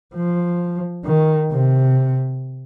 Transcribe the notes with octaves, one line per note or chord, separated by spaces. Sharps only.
F3
D#3
C3